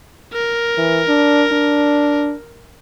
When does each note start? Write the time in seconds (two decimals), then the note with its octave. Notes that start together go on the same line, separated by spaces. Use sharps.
0.33 A#4
0.78 E3
1.08 D4
1.52 D4